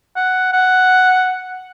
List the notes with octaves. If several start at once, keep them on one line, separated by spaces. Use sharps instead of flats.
F#5
F#5